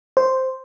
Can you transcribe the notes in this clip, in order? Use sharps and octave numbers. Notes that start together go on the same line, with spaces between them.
C5